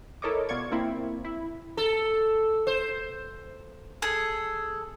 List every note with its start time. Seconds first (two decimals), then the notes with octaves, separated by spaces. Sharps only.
0.22 E4 A4 A#4 C#5 D#5 D6
0.49 B2 F4 D5 C#6 G#6
0.72 A#3 C4 E4
1.25 E4
1.77 A4
2.67 C5
4.02 G#4 A4